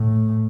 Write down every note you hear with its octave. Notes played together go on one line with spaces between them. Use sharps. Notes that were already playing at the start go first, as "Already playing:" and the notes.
Already playing: A2